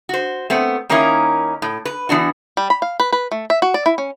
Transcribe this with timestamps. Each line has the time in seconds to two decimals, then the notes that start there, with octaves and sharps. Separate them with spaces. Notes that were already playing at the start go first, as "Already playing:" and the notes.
0.09 F#4 C5
0.50 A3 B3 C4
0.89 D#3 A#3 C#4 D#4 E4 A#4
1.62 A2
1.85 B4
2.09 E3 B3 D4 F#4
2.57 G3
2.70 B5
2.82 F5
3.00 B4
3.12 B4
3.32 A3
3.50 E5
3.62 F#4
3.74 D5
3.86 E4
3.98 C#4